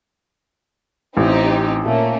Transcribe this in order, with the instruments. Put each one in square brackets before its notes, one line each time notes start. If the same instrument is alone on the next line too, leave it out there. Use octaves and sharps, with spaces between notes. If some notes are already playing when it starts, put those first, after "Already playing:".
[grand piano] A1 [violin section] C4 D#4 G4
[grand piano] A#2 [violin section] A3 A#3 C#4